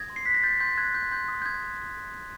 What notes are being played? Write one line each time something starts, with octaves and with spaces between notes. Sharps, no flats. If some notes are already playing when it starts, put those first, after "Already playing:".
Already playing: D#6 G#6 A#6
C6
C7
F#6 B6
A#6
C6 G6 A6
C6 G6
F#6 G#6
C6 G6
C6 G6
D#6
G6
D#6 G#6